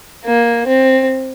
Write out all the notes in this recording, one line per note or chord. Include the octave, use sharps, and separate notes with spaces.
A#3
C4